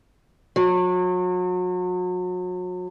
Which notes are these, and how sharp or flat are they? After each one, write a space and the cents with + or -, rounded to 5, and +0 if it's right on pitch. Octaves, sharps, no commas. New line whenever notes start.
F#3 -35